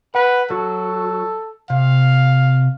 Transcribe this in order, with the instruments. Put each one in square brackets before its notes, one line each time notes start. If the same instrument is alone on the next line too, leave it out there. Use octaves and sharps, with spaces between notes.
[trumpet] B4 [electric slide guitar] F#5
[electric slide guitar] F#3 F#4 [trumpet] A4
[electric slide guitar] C3 [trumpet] F5